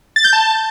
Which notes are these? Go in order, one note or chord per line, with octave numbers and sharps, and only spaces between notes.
A6
G6
A5